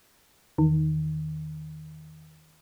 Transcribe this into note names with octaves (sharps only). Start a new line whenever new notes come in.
E2 D#3